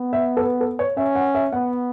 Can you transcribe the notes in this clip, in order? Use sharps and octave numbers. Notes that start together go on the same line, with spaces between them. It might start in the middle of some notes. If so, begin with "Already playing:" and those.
Already playing: B3
E5
A4
B4
A4
C#5
C#4 E5
F#5
E5
B3 F#5